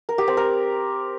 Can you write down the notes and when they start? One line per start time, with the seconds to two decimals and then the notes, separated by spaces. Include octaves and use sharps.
0.09 A#4
0.18 G4
0.28 C4
0.37 A#4